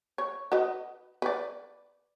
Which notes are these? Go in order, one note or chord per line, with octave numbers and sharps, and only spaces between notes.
C#5
F#4 B4 D#5
B4 D5